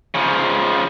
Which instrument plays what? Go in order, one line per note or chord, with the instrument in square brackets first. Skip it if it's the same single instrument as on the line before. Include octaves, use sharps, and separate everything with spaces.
[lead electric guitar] C#3 F3